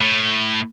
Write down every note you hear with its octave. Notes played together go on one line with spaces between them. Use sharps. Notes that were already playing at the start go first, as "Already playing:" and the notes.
A2